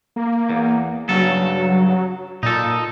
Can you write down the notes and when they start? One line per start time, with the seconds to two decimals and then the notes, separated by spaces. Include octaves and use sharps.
0.16 A#3
0.49 E2
1.09 G2 C#3 F#3 A4
2.43 A#2 D#4 A4